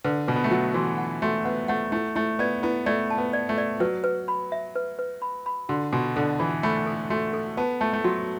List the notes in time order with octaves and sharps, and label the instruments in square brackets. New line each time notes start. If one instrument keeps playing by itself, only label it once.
[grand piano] D3 [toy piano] B4
[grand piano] B2 [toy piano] B4
[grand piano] B3
A3
[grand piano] F#3 [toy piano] F#5
[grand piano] E3 [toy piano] F#4
[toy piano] F#5
[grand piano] A3 [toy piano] F#4
[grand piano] B3 [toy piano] F#5
[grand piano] A3 [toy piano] F#5
[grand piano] A3 [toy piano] E4
[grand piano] A3 [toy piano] E4
[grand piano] B3 [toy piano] D5
[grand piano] B3 [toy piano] E4
[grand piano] A3 [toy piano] D5
[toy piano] A5
[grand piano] B3
[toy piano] D5
[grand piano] A3
[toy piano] D5
[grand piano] F#3 [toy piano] B4
[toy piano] B4
B5
E5
B4
B4
B5
B5
[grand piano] D3 [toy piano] F#4
[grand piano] B2 [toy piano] F#4
[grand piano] D3 [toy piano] A4
[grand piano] E3 [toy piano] B5
[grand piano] A3 [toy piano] B5
[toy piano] A4
[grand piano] A3 [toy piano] F#4
[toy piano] A4
[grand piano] B3 [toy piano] A5
[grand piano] A3 [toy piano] A5
[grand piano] A3
[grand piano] F#3 [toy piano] F#4